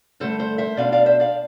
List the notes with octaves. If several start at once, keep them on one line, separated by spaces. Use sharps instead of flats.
G2 D3 A3 A4 C5
A4 C5
C5 E5
B2 B3 D4 D5 F5
D5 F5
C5 E5
D5 F5